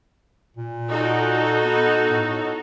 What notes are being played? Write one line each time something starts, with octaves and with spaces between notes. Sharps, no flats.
A#2
D#4 F#4 A4
B3
A2